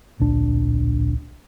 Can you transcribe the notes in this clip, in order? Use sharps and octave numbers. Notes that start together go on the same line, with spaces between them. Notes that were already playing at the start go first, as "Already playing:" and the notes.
D1 A#1 D4